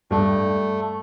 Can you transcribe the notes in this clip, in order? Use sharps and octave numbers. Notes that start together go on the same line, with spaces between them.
G2 A3